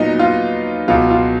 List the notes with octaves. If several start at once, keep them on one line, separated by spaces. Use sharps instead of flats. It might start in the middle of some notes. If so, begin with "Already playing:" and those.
Already playing: A#2 F#3 B3 D#4
F4
C#2 B2 F#3 F4
F4